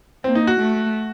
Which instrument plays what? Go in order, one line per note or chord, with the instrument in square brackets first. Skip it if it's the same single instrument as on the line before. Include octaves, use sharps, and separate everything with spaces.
[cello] A#3 [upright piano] C4
[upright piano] D#4
F#4
[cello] A3